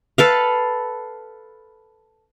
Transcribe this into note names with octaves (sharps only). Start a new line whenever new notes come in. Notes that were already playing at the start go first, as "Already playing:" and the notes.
A4 B4 F5